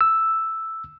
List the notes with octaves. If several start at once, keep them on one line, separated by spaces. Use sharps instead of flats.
E6